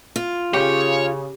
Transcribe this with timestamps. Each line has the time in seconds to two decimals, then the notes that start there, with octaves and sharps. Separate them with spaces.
0.16 F4
0.54 C#3 G4 C#5